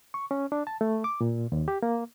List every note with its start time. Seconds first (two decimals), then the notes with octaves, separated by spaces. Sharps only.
0.14 C#6
0.31 C#4
0.52 D4
0.67 A5
0.81 A3
1.04 D6
1.21 A#2
1.52 D#2
1.68 G4
1.83 A#3